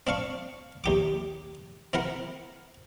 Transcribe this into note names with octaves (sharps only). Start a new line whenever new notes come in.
C4 D4 F5 C#6
D#2 G4 D6
C4 E4 A#4 F#5